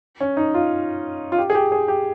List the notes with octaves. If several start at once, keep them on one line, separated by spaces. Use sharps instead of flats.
C#4
D#4
F4
F4
G4
G#4
G4
G#4
G4